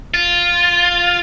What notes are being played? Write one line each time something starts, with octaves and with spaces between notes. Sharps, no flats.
F4